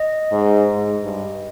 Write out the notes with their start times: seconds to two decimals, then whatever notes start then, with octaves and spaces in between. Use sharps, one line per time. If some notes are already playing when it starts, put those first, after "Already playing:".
Already playing: D#5
0.32 G#2
0.75 G#2
1.04 G2